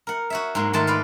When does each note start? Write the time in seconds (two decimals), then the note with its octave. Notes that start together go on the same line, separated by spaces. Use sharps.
0.07 A#4 F#5
0.30 F#4 C#5 E5
0.55 G#2 F#3 A#3
0.73 G#2 D#3 A3 F4 A5
0.87 B4 D5 F5